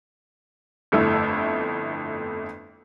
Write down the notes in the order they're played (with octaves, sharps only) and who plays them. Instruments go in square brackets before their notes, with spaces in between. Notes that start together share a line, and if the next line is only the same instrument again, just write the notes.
[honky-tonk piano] G1 F2 A3 E4 E6